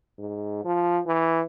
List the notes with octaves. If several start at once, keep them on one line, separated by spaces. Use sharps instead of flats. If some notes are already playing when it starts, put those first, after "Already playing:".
G#2
F3
E3